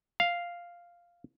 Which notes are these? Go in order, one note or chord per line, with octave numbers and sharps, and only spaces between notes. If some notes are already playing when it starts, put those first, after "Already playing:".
F5